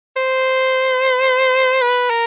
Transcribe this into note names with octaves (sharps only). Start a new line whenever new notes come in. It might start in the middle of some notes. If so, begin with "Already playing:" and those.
C5
B4
A#4